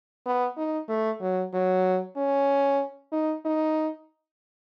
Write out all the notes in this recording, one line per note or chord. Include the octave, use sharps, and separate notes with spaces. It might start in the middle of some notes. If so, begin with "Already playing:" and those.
B3
D#4
A3
F#3
F#3
C#4
D#4
D#4